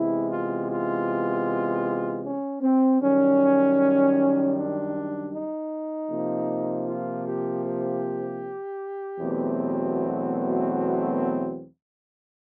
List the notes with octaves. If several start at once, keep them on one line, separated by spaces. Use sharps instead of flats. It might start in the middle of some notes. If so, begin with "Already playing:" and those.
Already playing: C3 E3 G#3 B3 E4
F4
F4
C#4
C4
F#2 D#3 G3 C#4
D4
D#4
C3 F3 A#3
F4
G4
G4
E2 B2 F#3 A3 C4
F#4